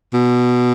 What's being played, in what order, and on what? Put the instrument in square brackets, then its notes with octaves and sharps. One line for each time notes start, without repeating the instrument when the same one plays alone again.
[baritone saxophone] B2